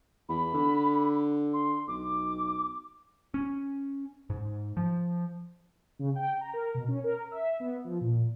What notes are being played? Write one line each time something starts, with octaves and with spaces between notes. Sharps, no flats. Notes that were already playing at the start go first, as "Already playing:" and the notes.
E2 B5
D3
C6
B1 D6
C#4
G#2
F3
C#3
G5
A#5
A#4
B2
C#4
A#4
E5
B3
F3
A#2